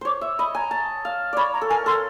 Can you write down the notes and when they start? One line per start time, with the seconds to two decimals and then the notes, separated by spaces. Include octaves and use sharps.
0.01 C5 C#5 D6
0.21 E5
0.39 D#5 B5
0.55 G#5 A#5
0.71 A5
1.05 F5
1.33 C#5 D5 B5
1.53 A#5
1.61 A4
1.69 A#4 G#5
1.86 A4 C6